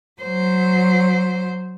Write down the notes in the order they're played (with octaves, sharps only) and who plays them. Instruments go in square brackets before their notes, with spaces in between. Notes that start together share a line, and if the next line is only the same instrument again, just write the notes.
[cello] F#3 C5